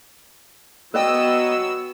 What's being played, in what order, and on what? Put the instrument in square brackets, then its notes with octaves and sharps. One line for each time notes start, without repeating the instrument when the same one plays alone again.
[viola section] F#3 B3 [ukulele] B4 D5 G5 [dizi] D#5 [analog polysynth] E6